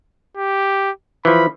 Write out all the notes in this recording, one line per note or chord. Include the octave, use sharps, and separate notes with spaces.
G4
E3 F3 B5